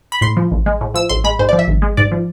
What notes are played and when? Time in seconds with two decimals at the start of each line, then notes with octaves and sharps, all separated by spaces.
0.12 B5
0.21 A2 C6
0.37 F3
0.51 A1
0.66 G#3
0.81 A2
0.94 F3 E6
1.09 A1 C6
1.24 G#3 B5
1.39 G#2 C5
1.49 F3 D5
1.59 E5
1.68 G#1
1.82 G#3
1.97 G#2 D5
2.12 F3